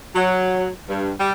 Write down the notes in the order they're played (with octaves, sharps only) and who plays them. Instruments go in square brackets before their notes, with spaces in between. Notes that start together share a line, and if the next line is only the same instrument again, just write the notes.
[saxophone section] F#3
G2
G3